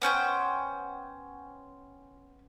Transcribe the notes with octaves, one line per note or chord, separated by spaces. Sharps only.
B3 C#4 C5 G5